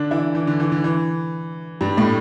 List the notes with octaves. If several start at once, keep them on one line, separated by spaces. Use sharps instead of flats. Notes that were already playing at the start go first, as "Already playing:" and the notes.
Already playing: D3 D4
E3 E4
E3
D3
E3
D3
E3
G2 G3
A2 A3